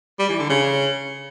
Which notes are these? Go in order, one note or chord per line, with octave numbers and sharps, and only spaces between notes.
G3
E3
D3
C#3